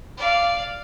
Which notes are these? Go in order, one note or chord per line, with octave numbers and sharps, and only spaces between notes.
D5 F5